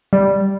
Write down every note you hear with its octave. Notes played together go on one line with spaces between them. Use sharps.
G3